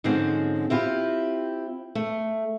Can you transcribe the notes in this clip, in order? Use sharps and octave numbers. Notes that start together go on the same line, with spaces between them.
G#2 D3 F3 G#3 C4 C#4
C4 E4 F4 G4
A3